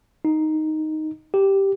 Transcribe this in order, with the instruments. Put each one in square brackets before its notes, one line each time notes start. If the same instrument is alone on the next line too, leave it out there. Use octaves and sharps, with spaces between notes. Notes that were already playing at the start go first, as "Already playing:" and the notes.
[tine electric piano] D#4
G4